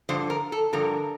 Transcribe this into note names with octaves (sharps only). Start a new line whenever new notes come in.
G2 D3 F3 C5
A#4
A4
G2 D3 F3 A#4